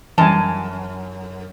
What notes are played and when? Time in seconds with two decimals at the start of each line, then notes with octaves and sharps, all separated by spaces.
0.18 F#2 E3 G3 G#5 A5